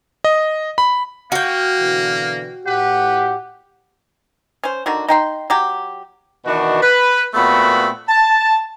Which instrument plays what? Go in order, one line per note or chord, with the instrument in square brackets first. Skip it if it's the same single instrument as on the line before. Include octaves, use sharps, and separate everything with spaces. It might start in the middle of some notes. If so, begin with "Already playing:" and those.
[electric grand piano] D#5
B5
[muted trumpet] A#3 [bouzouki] F#4 G5 [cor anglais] F5
[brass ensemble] B2 D3 E3
[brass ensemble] A2 F#5 [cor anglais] G4 [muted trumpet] B4
[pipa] C#4 C5
D3 D#3 F#4
D#4 G5 C6
F#3 G4
[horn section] B2 D#3 E3 D4 F#4
B4
A#2 A3 B3 C4 F#4 B5
A5